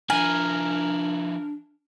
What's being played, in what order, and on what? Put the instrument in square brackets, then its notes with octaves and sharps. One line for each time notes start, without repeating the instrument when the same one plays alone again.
[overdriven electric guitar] F3 E4 [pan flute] D4 [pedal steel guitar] A#4 [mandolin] G#5